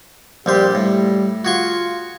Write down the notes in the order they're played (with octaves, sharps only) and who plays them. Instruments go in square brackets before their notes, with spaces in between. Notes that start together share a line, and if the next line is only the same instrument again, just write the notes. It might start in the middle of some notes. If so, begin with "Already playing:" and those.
[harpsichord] A#1 G3 C5 [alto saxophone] G4
[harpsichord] A2 [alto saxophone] G3
[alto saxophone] F4 [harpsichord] F#4 G#4 C#6